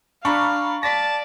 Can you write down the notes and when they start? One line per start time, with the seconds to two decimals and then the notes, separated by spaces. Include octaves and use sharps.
0.25 D4 F5 A#5 B5 C#6
0.83 D5 A5 A#6 B6